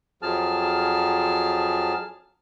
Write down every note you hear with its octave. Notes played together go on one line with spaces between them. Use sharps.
F2 F3 F#3 G#4 A5 F6